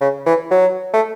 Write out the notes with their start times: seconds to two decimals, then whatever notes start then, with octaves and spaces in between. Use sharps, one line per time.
0.01 C#3
0.26 E3
0.51 F#3
0.93 A3